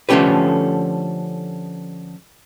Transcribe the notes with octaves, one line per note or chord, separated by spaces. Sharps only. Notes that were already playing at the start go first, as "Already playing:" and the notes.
D3 F3 A3 C#4 G4 B4